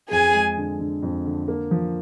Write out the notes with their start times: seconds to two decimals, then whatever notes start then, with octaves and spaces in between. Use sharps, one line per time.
0.11 F2 G#4 G#5
0.34 G#3
0.57 D3
0.80 D3
1.03 F2
1.25 D3
1.48 A#3
1.71 F3